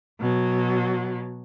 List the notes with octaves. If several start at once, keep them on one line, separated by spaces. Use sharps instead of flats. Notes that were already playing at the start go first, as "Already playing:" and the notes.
B2 F#3